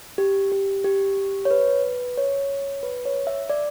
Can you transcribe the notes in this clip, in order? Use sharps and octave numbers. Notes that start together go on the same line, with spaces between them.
G4
G4
G4
C#5
B4
C#5
B4
C#5
E5
D5